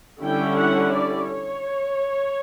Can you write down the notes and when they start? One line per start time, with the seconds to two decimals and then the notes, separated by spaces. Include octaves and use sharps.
0.22 D3 G3 C#4 E4 G5
0.56 F#5
0.92 D5
1.26 C#5